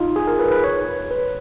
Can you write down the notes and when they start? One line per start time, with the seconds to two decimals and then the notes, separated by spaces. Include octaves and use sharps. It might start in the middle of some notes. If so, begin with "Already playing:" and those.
Already playing: D#4 F4
0.16 G#4
0.27 A#4
0.39 B4
0.51 B4
0.64 C#5
1.11 B4